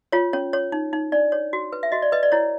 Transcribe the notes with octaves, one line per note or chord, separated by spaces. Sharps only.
F4 C#5
C#4 C#5
C#5
D#4
D#4
D4 D5
C#5
F#4
B4
E5
F#4 D#5
D5
B4 D#5
D5
E4 C#5